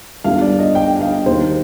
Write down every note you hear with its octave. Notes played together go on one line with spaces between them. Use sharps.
G1 G2 D3 F5
D5
D#5
G5
G5
F5
D#2 D#3 C5